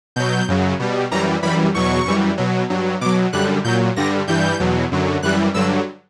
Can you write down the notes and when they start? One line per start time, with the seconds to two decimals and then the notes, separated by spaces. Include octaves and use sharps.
0.16 B2 F#3 G6
0.48 F#2 C#3 F#3
0.80 B2 G3
1.11 F#2 E3 G3 A#5
1.43 F#2 E3 G3 B5
1.74 E2 B2 F#3 C#6
2.05 F#2 E3 G3
2.38 B2 F#3
2.70 G2 F#3
3.01 B2 F#3 D6
3.33 F#2 D3 G3 F#6
3.64 A#2 F#3 G6
3.96 G2 D3 G3 A#6
4.27 G2 E3 G3 G6
4.60 E2 B2 F#3
4.92 F#2 D3 F#3
5.23 F#2 E3 G3 F#6
5.54 G2 D3 F#3 E6